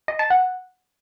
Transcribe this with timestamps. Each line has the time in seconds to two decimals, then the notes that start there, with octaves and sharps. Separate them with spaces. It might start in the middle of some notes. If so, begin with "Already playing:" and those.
0.08 D#5
0.19 A5
0.30 F#5